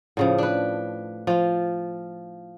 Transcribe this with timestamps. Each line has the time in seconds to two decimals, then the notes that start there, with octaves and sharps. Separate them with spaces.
0.17 A2 C#3 F3
0.38 D4 B4
1.27 F3 F4